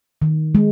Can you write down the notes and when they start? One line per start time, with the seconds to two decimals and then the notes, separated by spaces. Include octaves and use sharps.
0.22 D#3
0.55 G#3